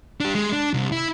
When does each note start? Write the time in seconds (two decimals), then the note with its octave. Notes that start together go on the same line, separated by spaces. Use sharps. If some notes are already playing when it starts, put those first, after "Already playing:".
0.20 D4 G4
0.35 G#3
0.52 D4
0.74 C2
0.92 E4